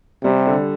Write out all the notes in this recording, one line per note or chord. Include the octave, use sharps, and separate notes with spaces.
C3 G3
D3